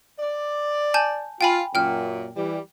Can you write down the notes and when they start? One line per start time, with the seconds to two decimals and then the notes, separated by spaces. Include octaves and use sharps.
0.20 D5
0.94 G#5 A5 G6
1.41 F4 G5 G#5 B5
1.75 F#2 A#2 G5 F6
2.36 E3 G3